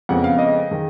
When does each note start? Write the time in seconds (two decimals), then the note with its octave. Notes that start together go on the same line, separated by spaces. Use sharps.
0.09 F2 C#3 G#3 B3 F#5
0.24 F5
0.38 D#5
0.71 D#3 G#3